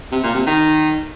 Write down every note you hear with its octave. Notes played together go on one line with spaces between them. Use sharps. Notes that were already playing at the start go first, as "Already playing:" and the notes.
C3
A#2
C3
D#3